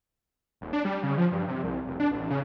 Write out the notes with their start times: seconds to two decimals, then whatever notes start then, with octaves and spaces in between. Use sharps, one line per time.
0.61 D#1
0.73 D4
0.85 G3
1.03 C#3
1.18 F3
1.32 G2
1.48 C3
1.64 C2
1.87 F1
2.00 D4
2.11 A1
2.30 C#3